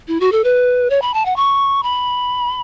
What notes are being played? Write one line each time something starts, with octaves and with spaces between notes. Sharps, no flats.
E4
F#4
A4
B4
C#5
B5
A5
F#5
C#6
B5